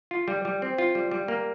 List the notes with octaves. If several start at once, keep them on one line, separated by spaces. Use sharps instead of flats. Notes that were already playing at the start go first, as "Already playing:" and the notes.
F4
G3
G3
C4
F4
G3
G3
A#3